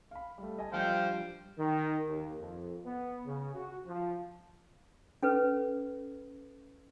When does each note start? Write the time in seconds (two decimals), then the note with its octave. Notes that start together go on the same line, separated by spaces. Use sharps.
0.11 F5 B5
0.38 G3 A3
0.59 D#5 G#5 A5
0.73 F3 G3 D4 C5 F5 G5
1.58 D#3
2.07 D#2
2.39 F2
2.86 B3
3.26 C#3
3.55 F#4
3.87 F3
5.23 C#4 A4 B4